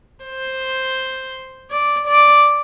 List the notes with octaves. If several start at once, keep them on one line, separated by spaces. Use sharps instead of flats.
C5
D5
D5